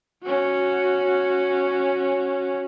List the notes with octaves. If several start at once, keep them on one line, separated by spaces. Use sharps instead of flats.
C#4 F#4